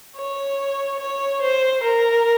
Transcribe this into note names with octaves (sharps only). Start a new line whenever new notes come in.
C#5
C#5
C5
A#4